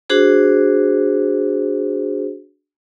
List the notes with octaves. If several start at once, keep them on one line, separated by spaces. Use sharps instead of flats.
D4 F#4 G#4 C5